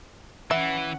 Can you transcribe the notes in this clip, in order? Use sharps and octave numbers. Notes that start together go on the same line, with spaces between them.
E3 C#4 E5 F#5